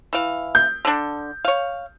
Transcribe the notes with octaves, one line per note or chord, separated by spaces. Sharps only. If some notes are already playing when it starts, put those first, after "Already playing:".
E3 F5
G6
D3 D4
C#5 F5